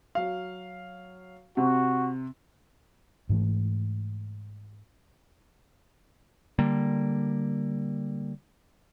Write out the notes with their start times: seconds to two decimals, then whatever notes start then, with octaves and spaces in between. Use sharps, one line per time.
0.15 F#3 F5
1.57 C3 F#4
3.29 G#2 E3 A3
6.59 D3 G3 A#3